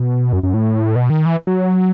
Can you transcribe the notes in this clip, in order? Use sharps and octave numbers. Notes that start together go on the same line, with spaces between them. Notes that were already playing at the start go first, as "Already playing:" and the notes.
Already playing: B2
F#2
F#2
A2
B2
D#3
E3
F#3